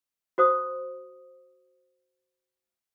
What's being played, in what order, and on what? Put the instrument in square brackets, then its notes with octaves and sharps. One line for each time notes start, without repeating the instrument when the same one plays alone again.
[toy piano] F#4 C5 D#6